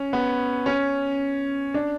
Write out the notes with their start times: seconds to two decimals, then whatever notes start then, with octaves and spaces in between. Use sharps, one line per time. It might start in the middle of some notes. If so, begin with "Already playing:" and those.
Already playing: C#4
0.13 B3
0.66 C#4
1.74 D4